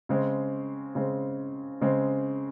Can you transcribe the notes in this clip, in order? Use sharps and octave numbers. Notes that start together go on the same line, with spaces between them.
C#3 G#3 C4
C#3 G#3 C4
C#3 G#3 C4